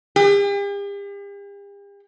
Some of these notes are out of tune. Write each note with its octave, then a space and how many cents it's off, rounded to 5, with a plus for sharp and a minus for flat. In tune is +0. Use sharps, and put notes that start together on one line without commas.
G4 +45